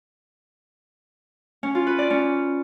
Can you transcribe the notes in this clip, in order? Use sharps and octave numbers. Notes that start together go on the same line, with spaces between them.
C#4
F4
B4
D5
C#4